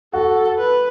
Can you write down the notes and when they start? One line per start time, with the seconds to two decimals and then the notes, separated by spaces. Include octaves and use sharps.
0.13 F#4 A4
0.58 B4